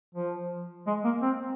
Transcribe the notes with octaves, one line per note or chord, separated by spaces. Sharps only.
F3
G#3
A#3
C4